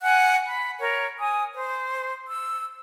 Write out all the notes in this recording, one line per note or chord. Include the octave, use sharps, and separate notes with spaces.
F#5 G#5 F#6
B5
A#4 C#5
G#5 D#6
C5
E6